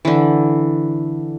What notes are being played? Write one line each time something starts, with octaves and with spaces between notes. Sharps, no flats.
D3 E3